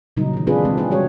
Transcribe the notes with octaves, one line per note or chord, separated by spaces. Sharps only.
A#2 C#3 F#3 G3 D#4
D#3 E3
G#3 C4 D4 F4 G#4 B4
C3 D#3 G#3 C4
B3 C#4 E4 G#4 C5
G3 C#4 F#4 C#5